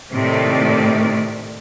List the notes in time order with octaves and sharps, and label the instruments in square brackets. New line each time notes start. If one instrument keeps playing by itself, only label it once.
[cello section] A2 C3 D#3 A3 D5